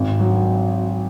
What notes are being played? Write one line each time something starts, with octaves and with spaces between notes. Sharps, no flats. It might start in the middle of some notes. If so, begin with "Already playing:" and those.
Already playing: G#1
F#3